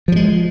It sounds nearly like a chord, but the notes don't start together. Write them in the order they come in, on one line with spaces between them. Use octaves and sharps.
F3 F#3 G#3